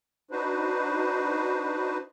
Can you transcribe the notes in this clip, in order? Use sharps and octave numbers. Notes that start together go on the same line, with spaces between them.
D4 D#4 F#4 B4 C5